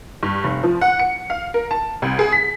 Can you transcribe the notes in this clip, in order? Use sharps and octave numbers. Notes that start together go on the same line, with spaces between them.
G2
F1
F3
F#5
C#7
F5
A#4
A5
C2
G#4
B6